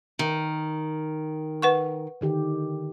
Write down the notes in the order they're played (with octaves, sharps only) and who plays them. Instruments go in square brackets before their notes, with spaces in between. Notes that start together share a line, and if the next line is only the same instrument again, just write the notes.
[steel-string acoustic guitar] D#3
[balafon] B4 F#5 C#6
[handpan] D3 D#3 G4